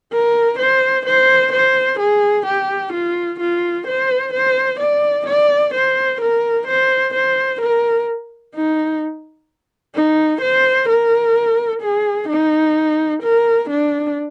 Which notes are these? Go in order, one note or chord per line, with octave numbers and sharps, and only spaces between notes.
A#4
C5
C5
C5
G#4
G4
F4
F4
C5
C5
D5
D5
C5
A#4
C5
C5
A#4
D#4
D#4
C5
A#4
G#4
D#4
A#4
D4